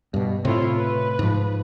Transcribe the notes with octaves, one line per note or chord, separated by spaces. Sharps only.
G2 B2
A2 C3 E4 F4 C#5
B4
G#2 F3